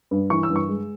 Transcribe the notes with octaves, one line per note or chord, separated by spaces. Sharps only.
G2
E3 C#6
E6
G2
C#6
G#3